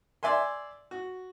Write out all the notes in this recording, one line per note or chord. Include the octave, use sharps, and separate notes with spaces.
D5 E5 G#5 C6
F#4